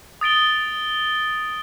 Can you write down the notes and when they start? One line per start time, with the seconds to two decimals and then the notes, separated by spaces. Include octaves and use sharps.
0.21 D#6 A6 D7 G7